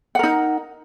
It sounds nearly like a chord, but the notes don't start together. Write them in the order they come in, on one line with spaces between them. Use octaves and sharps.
F#5 A#4 D#4